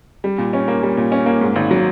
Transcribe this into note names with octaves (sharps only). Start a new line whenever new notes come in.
G3
A#2
C#4
A#3
G3
A#2
C#4
A#3
G#2
G#1
F#3